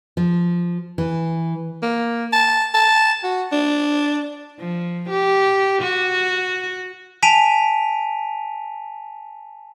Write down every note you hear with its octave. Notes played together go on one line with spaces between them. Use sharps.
F3
E3
A#3
A5
A5
F#4
D4
F3
G4
F#4
G#5 A5 B6 D7 D#7 F7